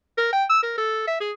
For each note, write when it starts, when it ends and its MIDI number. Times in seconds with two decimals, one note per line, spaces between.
0.17 0.28 70
0.33 0.44 79
0.49 0.61 88
0.62 0.74 70
0.78 1.05 69
1.07 1.19 76
1.20 1.31 68